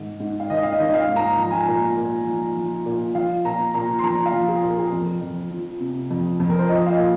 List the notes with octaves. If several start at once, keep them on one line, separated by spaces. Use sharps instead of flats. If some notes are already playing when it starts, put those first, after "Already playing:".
Already playing: G#2 D#3
G#2
F5
D#3 D#5
F5
D#5
D#3
D#5
F5
G#2
A#5
F3 A#5
G#5
A#5
A#2
A#2
F3
F3
A#2
F3 F5
A#2 A#5
A#2 A#5
C6
F3 A#5
F5
F3
G#4
A#2
A#4
G#4
A#4
F2
F2
F3
C3
F2
F2
A#4
C5
F3 D#5
F5
D#5
A#2